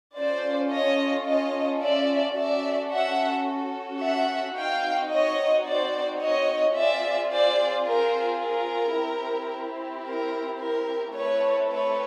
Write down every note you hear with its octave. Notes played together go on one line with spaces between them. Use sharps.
C#4 F4 A4 C5 D5
C#5 D#5
C#5 D#5
D5 E5
C#4 F#4 A4 D5 E5
E5 F#5
E5 F#5
C4 D#4 F#4 F5 G5
C#5 D#5
C5 D5
C#5 D#5
C4 F4 G#4 D5 E5
C5 D5
A#4 C5
A#4
C4 E4 G4
A#4
A#4
A3 C4 E4 A4 B4 C#5
B4 C#5